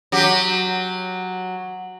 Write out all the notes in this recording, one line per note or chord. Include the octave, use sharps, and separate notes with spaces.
F#3 G4